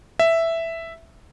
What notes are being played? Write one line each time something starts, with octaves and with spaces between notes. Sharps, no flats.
E5